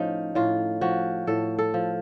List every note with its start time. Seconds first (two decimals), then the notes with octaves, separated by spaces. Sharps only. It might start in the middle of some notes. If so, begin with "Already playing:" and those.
Already playing: A2 F3 C#4 D#4
0.35 A2 F4
0.81 F3 F#4
1.27 A2 A4
1.59 A4
1.74 F3